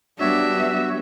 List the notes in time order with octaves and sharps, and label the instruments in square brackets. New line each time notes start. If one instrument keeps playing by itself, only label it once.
[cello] G3 B3 [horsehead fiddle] D4 [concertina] F#4 C#5 [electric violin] E5